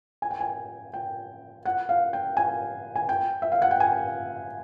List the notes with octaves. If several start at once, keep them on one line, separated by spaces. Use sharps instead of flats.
G#5
G5
G#5
G5
F#5
F5
G5
G#5
G#5
G5
E5
F5
F#5
G5
G#5